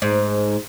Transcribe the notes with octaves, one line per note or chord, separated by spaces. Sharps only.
G#2